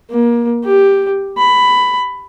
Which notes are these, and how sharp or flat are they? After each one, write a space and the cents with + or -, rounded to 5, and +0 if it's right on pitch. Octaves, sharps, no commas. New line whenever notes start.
A#3 +25
G4 +5
B5 +10